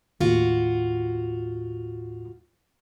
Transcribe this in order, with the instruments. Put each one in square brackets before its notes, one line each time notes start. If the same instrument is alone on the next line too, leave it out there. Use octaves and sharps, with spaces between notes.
[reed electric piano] D#2 A2 [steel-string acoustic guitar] F4 F#4